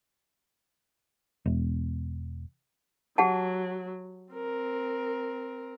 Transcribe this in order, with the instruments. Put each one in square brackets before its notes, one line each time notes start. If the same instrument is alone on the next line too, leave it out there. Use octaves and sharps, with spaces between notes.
[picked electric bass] E1
[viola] F#3 [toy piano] G4 F#5 A5
[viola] C4 A#4